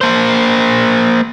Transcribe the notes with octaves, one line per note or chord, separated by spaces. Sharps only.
A#3 C5